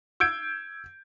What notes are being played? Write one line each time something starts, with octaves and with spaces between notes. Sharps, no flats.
E6 G6 G#6 D7